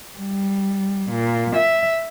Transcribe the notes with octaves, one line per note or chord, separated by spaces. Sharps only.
G3
A#2
E5